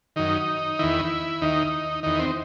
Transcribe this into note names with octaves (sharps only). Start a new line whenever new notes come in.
F#2 D#3 D#4
E2 D#3 E4
D#2 D#3 D#4
E2 D#3 D#4
C4